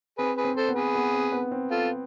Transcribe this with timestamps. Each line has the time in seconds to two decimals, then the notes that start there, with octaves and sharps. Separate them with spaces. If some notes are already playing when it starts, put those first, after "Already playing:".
0.18 C4 G#4 B4
0.37 G#4 B4
0.44 C4
0.57 A4 C5
0.69 B3
0.75 G#4 B4
0.95 B3
1.14 C4
1.32 B3
1.52 C4
1.71 F4 A4